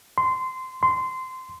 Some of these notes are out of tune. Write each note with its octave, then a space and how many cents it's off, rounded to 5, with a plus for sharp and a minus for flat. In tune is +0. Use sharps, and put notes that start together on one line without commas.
C6 -20
C6 -20